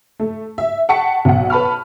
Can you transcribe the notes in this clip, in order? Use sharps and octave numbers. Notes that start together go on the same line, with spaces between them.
A3
E5
F#5 G5 A5 C#6 B6 C#7
B1 F#5
B4 A5 B5 C#6 F6